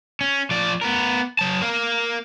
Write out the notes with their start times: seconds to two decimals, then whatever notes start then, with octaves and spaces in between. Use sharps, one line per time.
0.21 C#4
0.51 F3 D5
0.82 B3 A#4
1.39 F#3 A5
1.62 A#4 F5